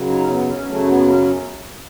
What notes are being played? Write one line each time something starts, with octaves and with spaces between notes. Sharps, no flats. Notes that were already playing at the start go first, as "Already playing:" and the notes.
Already playing: F#2 C#3 F#3
D#4
C#4
B3
C#4
F#2 C#3 F#3 A3
B3
C#4